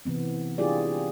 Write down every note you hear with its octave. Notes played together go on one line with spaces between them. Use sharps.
C3 E3 B3 C4
D4 E4 F4 G4 G#4 D5